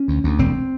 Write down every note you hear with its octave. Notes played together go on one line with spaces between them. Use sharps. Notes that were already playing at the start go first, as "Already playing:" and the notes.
Already playing: C#4
D2
D2
E1 C4